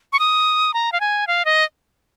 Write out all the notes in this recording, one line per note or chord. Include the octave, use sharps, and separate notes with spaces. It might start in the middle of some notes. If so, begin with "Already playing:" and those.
C#6
D#6
A#5
F5
G#5
F5
D#5